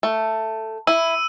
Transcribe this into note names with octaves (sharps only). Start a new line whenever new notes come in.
A3
E4 E6 D#7